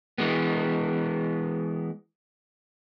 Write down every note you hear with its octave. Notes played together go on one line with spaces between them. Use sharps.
E3 G#3 B3